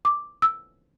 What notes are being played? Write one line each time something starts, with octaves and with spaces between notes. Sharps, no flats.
D6
E6